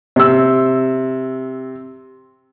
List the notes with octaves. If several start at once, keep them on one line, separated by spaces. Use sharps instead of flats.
C3 E6